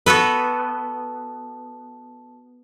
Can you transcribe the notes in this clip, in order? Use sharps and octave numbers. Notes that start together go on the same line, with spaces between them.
B3 F#4 A4 B4